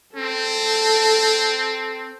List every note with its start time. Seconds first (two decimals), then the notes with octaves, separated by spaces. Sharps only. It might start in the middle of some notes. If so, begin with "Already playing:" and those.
0.16 C4 A4